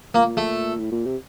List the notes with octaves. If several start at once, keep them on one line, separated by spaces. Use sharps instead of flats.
A#2 A#3
A3
A2
A#2
C3